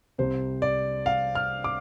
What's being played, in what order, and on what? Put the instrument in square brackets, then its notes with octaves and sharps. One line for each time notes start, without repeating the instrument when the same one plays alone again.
[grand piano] C2 C3 G3 C4 C5
D5
F5
F6
D6